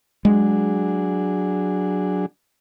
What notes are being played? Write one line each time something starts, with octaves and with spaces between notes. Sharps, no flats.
F#3 G#3 D4 G#4